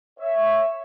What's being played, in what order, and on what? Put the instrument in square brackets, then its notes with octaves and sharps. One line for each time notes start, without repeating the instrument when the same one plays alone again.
[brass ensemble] C#5 E5